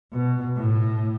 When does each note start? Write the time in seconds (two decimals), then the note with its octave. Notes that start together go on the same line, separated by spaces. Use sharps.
0.13 B2
0.57 A2